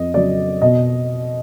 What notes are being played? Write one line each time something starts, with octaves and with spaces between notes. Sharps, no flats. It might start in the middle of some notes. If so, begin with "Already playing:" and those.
Already playing: F2 D#5
C#3 F#3 D5
B2 D#5